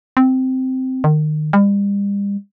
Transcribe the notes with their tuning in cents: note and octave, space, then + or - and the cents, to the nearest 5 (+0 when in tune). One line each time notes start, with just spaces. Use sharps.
C4 -10
D#3 -30
G3 +40